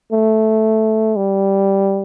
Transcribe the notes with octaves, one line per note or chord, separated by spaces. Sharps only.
A3
G3